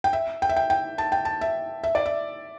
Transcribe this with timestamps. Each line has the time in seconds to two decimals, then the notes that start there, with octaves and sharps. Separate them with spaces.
0.04 G5
0.13 E5
0.42 G5
0.49 E5
0.56 G5
0.70 G5
0.98 A5
1.12 G5
1.25 A5
1.41 E5
1.84 E5
1.95 D5
2.06 E5